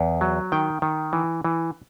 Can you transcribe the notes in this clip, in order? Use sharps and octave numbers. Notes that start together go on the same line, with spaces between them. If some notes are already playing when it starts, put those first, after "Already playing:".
Already playing: E2
F#3
D#3 G5
D#3
E3
E3